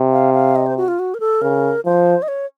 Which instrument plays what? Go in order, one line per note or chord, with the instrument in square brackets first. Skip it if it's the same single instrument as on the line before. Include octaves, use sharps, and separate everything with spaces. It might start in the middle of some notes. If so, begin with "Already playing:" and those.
Already playing: [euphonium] C3
[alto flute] F5
F5
D#5
C5
F#4
F4
F#4
A#4
A4
[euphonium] C#3 [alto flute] A#4
[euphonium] F3 [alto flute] C5
[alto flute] D#5
C#5